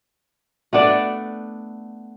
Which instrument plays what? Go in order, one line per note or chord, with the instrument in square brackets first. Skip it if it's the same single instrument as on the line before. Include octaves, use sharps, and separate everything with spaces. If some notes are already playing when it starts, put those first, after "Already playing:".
[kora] A3 B3 D4 D5